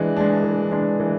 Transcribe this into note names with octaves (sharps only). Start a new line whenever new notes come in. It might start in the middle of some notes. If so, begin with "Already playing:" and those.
Already playing: E3 G#3 D4
G#3 D4
E3
G#3 D4
E3